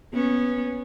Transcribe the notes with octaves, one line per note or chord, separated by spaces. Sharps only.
B3 C#4